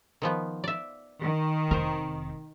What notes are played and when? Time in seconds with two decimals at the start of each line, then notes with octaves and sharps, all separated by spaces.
0.22 D#3 F3 B3
0.64 D5 E5
1.22 D#3
1.71 F1 C4 A#4 C5